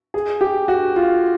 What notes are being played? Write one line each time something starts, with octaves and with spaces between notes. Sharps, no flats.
G#4
G4
F#4
F4